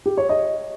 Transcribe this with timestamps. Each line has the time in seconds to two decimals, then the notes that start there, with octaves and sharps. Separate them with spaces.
0.06 G4
0.17 C#5
0.29 D#5